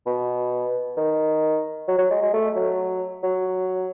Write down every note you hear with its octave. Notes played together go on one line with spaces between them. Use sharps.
B2
D#3
F#3
F#3
G#3
G#3
A3
F#3
F#3